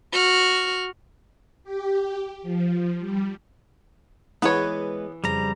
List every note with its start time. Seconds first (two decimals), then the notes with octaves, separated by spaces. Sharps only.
0.13 F#4 F6
1.64 G4
2.42 F3
3.00 G3
4.42 E3 G#3 B3 B4 C#5 D#5
5.24 F2 C#3 G3 C5 A#5